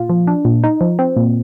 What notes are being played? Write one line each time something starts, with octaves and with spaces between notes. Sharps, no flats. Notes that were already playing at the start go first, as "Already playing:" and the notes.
Already playing: A#2 F4
F3
D4
A#2
D#4
F3
C4
A#2